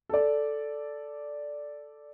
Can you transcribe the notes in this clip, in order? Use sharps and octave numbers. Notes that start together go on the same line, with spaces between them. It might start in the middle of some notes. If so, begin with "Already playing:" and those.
A4 D5